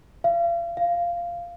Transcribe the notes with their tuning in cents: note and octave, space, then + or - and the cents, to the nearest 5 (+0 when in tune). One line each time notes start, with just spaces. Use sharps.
F5 -40
F5 -10